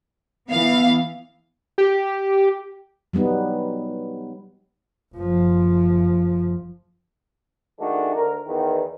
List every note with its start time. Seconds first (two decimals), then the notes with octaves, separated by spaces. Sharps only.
0.51 E3 B3 F5
1.78 G4
3.13 F#3 G3 B3 D#4
5.15 F#1 F3
7.79 D#3 G#3 A3 D4 F#4
8.14 D2 A#4
8.46 E2 D#3